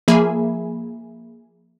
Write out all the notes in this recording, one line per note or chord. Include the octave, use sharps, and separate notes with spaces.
F3 A#3 G#4 E5 G#5 B5